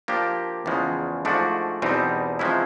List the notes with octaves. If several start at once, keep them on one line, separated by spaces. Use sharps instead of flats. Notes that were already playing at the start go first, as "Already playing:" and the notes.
F3 A#3 D4 G4
E2 C#3 F3 G#3
G#2 F3 A3 D4 F#4
E2 B2 G3 C4 D#4
C3 F3 G#3 C#4 E4